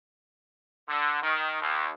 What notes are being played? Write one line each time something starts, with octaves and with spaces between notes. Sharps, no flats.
D3
D#3
D#2